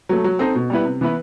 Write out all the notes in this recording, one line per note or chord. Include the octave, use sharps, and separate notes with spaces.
F#3 A3
F#3
C4 D#4 A4 D#5
B2
G3 B3 E4 B4
C3
E3 B3 E4 B4